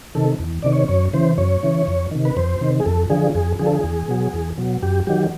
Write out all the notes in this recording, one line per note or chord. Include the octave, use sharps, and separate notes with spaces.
C3 D#3 A4
E2
C3 D#3 D5
C#5
F#2 C#5
C#3 E3 C5
F#2 C#5
C#3 E3
F2
C3 D#3
B4
F2 C5
C3 D#3
G#4
F2 A4
D3 F3 G#4
F2 G#4
D3 F3 G#4
A4
G#4
E2
B2 F#3
E2
B2 F#3
F#2 G4
D#3 F#3 G4